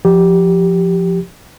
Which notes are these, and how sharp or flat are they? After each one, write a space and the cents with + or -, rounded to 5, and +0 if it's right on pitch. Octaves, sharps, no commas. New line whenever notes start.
F3 +0 G4 -5